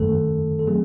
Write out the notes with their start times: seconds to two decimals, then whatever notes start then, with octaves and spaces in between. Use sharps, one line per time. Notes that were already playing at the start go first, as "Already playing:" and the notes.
Already playing: F#2 D#3 A3 A4
0.59 A4
0.67 F#3 A3 C4 G#4